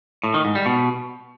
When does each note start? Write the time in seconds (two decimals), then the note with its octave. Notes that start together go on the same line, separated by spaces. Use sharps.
0.24 A2
0.34 D#3
0.45 G#2
0.55 G3
0.66 B2